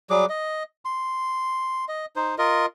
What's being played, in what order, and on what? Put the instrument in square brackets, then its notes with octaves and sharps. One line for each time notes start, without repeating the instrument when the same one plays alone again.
[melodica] F#3 G3 G#4 D6
D#5
C6
D#5
D#4 C5
F4 A#4 D#5